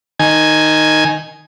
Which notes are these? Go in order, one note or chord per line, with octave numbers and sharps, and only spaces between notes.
D#3 G#5